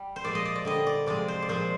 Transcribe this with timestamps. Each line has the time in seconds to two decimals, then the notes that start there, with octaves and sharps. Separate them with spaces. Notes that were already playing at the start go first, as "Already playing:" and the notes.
Already playing: G3
0.16 C5
0.24 A#2 F3 G#3 D5
0.35 D#5
0.45 D5
0.55 D5
0.65 D3 G3 D#5
0.87 D5
1.06 C3 F3 G#3 D5
1.28 C5
1.42 D5
1.49 A#2 F3 G#3 C5